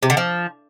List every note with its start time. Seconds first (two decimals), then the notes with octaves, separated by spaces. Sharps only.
0.03 C3
0.10 D3
0.17 F3